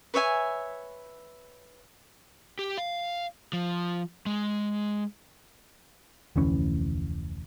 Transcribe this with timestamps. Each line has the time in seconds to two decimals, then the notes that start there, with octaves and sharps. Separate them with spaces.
0.14 B4 C#5 E5 G#5
2.59 G4
2.78 F5
3.53 F3
4.26 G#3
6.36 F1 D2 E3 C#4